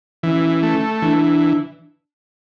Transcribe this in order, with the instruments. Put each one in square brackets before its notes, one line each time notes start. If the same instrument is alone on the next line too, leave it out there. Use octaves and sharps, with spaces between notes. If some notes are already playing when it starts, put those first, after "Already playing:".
[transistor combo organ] E3 [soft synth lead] C#4
[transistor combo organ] A3
[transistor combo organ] E3 [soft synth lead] D4